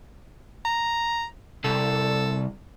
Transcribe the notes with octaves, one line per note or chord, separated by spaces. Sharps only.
A#5
C2 A4